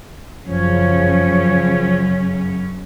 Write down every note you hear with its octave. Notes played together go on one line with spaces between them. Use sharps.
F#2 C#3 F3 C#4 C#5